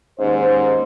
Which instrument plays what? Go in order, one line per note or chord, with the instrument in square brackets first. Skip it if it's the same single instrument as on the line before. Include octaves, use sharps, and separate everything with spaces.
[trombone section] D#2 C#4 C5 [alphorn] G#2